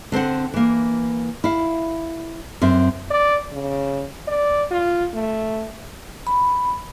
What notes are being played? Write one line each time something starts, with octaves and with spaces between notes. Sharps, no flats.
D3 C4 C5 F#5
E3 A#3
E4 F5
F#2 C4 E5
D5
C#3
D5
F4
A3
B5